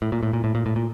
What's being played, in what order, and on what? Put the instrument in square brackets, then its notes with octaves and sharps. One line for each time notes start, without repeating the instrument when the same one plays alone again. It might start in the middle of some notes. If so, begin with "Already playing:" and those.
[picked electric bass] A2
A#2
A2
A#2
A2
A#2
A2
A#2